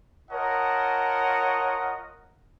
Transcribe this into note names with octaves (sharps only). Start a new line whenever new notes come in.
F4 A#4 C#5 D#5 F#5 A5